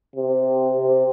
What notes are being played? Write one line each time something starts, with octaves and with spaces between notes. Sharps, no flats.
C3
C3